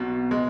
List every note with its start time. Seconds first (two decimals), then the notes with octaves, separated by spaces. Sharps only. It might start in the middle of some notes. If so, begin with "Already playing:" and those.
Already playing: B1 B2
0.31 G#3